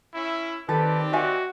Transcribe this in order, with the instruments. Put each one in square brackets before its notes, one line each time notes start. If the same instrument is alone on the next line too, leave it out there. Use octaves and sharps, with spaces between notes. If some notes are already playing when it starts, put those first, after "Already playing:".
[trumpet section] C#4 E4
[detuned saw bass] D#3 [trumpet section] C4 G4 D5 [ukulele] A4 [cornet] B4
[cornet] F#4 [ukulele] D#5 E5 G#5